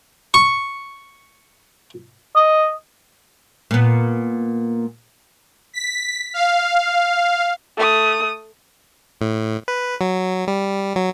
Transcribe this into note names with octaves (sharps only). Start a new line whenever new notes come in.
C#6
D#5
A#2 B3
B6
F5
A3 D#6
A2
B4
F#3
G3
F#3